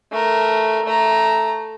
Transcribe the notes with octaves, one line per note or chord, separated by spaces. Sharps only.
A3 A#4
A3 A#5